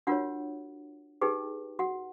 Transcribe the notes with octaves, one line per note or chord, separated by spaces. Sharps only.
D4 F4 F#4 A#4 C#5 F#5
D#4 G4 G#4 B4 G5
F#4 F#5